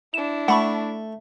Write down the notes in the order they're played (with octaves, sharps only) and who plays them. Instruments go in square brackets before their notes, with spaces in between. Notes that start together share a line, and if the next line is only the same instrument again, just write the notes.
[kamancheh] D4 E4 [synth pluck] E7
[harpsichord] A3 [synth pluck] F#5 B5 C#6